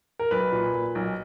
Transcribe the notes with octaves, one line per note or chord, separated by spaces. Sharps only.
A#4
B1 B4
A#2
A#2
B1